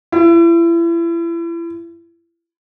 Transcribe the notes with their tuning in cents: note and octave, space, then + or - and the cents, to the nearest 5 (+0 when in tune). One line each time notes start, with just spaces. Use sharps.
E4 +35